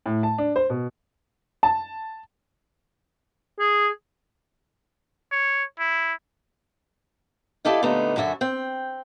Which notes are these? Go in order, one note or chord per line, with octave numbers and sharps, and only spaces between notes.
A2
A5
D4
C5
B2
A5
G#4
C#5
E4
E4 G4 A4 D5 D#5 F5
A#2 D3 A3 B3 D#4
F#2 D3 F#4 E5 G#5
C4 G5